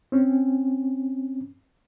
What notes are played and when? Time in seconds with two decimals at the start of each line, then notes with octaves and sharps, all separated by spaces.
0.12 C4 C#4